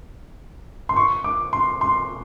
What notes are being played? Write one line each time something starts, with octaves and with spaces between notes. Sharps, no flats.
C6
C#6
D6
C6
C6